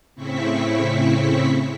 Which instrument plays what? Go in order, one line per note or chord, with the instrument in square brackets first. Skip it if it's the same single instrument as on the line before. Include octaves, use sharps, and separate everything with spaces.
[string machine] A2 C#3 C4 E4 C#6 B6